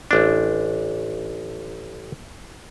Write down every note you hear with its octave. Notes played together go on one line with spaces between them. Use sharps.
A1 D4